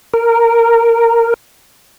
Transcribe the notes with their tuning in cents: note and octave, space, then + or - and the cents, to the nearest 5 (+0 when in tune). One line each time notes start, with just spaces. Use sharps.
A#4 -10